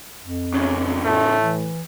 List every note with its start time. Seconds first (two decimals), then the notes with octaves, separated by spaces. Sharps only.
0.23 F2
0.54 E2 C#3 C#4
1.04 A2 A3
1.39 E3